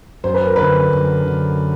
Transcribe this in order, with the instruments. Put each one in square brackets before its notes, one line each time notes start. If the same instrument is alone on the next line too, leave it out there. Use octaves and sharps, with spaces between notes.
[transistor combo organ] F#2 [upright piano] C5
[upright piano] B4
A#4
[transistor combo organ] D3 [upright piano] B4
[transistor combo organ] F#2
D3